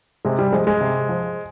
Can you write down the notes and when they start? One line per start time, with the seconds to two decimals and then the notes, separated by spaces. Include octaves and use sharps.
0.25 C3 G#3
0.39 G3
0.53 F3 G#3
0.67 G#3
0.81 C3
1.09 F3